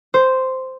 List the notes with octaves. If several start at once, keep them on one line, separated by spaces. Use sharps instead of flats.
C5